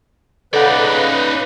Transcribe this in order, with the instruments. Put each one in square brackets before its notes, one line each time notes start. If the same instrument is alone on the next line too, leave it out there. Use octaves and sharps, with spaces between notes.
[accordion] C#3 B4 [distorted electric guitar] D#4 D5 [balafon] A4 F#5